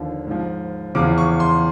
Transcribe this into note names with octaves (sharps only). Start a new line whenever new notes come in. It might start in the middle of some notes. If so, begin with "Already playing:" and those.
Already playing: D#2 D3 F3
G#2 F3
E2 C#3 F3 D6
C#6
C6